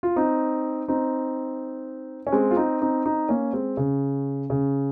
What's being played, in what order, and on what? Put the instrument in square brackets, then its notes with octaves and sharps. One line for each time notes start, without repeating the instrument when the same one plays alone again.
[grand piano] F4
C4 D#4
C4 D#4
C#4
G#3 C4
F4
C4 D#4
C4 D#4
C4 D#4
A#3 C#4
G#3 C4
C#3
C#3